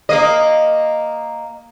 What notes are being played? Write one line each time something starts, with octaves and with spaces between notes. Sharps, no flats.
A#3 D#5